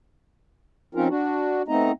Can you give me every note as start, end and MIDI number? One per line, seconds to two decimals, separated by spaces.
0.95 1.08 53
0.95 1.08 60
0.95 1.08 61
0.95 1.08 63
0.95 1.08 65
0.95 1.08 70
1.08 1.62 62
1.08 1.62 66
1.68 1.92 57
1.68 1.92 59
1.68 1.92 60
1.68 1.92 63
1.68 1.92 75
1.68 1.92 82